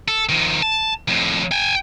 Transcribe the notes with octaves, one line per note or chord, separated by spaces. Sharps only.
A4
D#3 F3
A5
F2 A2
G5 G#5